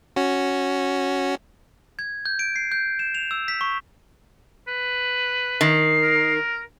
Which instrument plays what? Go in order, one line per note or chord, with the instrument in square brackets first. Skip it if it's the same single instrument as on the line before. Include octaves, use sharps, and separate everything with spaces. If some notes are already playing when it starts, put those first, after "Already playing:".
[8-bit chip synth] C#4 F#4
[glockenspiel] G#6
G6
D7
C7
G6
E7
F7
E6
B6
C#6
[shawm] B4
[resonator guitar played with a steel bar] D#3 [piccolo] C7
[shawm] A#4